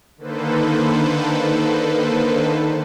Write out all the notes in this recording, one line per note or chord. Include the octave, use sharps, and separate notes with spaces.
D3 D#3 A#3 A4 B4 C5